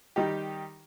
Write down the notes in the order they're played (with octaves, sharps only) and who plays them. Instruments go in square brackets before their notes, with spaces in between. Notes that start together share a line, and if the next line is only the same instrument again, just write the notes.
[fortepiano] D#3 G3 D#4 G4